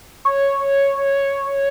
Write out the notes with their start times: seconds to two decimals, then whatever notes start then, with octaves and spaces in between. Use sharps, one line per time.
0.25 C#5